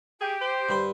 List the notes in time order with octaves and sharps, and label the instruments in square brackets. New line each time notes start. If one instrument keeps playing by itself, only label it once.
[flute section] G4 [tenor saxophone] G#4
[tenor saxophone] C5
[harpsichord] G2 B5 C6